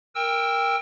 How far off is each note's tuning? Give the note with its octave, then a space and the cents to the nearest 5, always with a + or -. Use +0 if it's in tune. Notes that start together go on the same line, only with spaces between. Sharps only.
A#4 +0 G5 +25 E6 +0